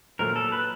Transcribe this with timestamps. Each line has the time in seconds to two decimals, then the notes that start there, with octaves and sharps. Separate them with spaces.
0.19 A#2 F#3 A3 A#4
0.36 A4
0.52 B4